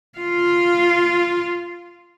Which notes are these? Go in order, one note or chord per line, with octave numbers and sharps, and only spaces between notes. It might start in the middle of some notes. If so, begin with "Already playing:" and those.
F4 F5